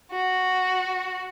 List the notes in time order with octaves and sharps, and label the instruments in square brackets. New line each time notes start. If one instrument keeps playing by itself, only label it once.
[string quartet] F#4